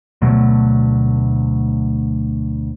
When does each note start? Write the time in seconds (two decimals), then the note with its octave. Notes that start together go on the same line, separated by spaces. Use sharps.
0.22 D2 B2 F#3 A3